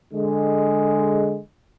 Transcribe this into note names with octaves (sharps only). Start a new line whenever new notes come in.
D3 G#3